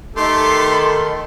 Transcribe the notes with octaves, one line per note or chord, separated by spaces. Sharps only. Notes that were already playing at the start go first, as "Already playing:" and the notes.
D#3 A3 G4 A4 C6